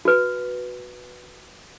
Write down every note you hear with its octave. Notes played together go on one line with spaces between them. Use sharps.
F#4 B4